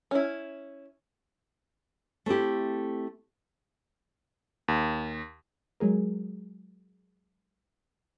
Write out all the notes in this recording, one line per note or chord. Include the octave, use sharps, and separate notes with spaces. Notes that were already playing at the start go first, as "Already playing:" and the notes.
C#4 E4
A3 C4 E4 G4
D#2
F#3 G#3 G#4 A#4